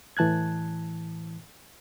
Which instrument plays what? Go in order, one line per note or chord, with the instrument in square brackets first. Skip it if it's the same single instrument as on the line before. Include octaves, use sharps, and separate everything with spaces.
[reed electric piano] A2 E3 A5 F#6 G#6